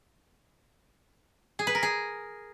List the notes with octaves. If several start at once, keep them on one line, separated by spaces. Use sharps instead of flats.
G#4
B4
A#4
G#4